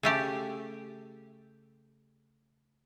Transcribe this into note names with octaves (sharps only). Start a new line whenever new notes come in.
C#3 A3 G4